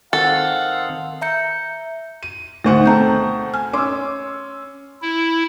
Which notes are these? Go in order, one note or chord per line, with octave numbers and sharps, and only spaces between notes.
D#3 C4 A4 F5 F#5
E5 A#5 G6 C#7
D#7
D2 B2 D#3 A3 D#4 C5 F#5
C4 A4 A5 A#5 G6
G#5 F6
C#4 C6 D6 E6
E4